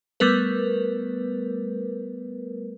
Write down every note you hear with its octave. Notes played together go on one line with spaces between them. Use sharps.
G3 A3 B3 A#4 B4